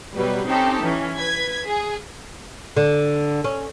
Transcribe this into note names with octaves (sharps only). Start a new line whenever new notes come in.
B2 F#3 G3 B4
C4 C#4 D#4 G4 A4
E3 C#4
B4 G#6 B6
G#4
D3
C#4